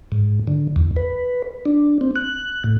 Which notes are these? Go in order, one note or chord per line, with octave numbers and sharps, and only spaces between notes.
G#2
D3
E2
B4
D4
C4
F#6
A2